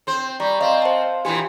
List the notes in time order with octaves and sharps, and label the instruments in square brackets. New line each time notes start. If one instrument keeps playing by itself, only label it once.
[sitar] C4 C5
[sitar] G3 [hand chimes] D5 A#5 C#6
[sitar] C4 [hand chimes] D#5 [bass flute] F5
[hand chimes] C5 A5
[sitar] A#2 E3 B3 [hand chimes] G4 G#5 C6